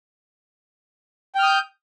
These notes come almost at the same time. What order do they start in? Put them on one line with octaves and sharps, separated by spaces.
G5 F6 D#6 G6